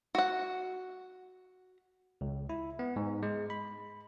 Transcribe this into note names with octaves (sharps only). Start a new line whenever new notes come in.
F#4 F#5
C#2
E4
B3
G#2
G#3
B5